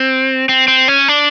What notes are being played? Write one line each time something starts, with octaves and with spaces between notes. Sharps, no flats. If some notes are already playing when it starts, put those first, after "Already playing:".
Already playing: C4
C4
C4
C#4
D4